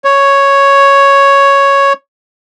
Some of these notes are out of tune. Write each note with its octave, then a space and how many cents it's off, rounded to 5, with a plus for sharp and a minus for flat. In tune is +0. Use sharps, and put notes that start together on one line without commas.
C#5 +0